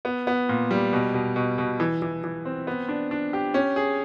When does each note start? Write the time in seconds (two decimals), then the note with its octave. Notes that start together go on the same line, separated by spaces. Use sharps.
0.05 B3
0.27 B3
0.49 A#2
0.71 G3
0.93 B2
1.14 B2
1.36 B2
1.58 B2
1.80 E3
2.02 E3
2.24 E3
2.45 C4
2.67 B3
2.89 D4
3.11 D4
3.33 G4
3.54 C#4
3.76 G#4